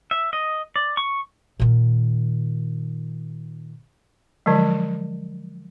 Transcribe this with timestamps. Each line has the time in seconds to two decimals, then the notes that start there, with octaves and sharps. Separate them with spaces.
0.11 E5
0.33 D#5
0.76 D5
0.97 C#6
1.60 A#2 D#3
4.46 D3 F3 F#3 G#3